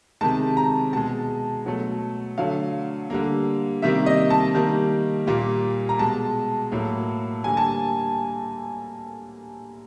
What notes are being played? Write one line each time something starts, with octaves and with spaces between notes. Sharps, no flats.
C3 D#3 G#3 A5
A#5
B2 G#3 A5
B2 F#3 A3
D3 F#3 A3 F5
D3 G3 A#3
C3 D#3 G3 A#3 E5
D#5
A5
D#3 G3 A#3
A#2 G3 A#3
A#5
B2 G#3 A5
A2 F#3 A#3
D3 G3 A#3 G#5
A5